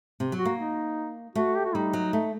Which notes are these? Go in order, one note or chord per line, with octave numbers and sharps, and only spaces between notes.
C3
F#3
F#4
A#3
D#4
A3 F#4
G4
F#4
G3 D#4
F#3
A3